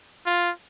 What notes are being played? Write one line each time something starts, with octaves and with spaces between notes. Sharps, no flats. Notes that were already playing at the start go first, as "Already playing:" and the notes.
F4